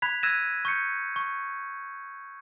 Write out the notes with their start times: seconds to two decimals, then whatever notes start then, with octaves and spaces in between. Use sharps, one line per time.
0.02 B5 F#6 G#6 B6
0.23 E6 F#6 G#6 A#6 D#7 E7
0.65 C#6 G6 C#7
1.16 C#6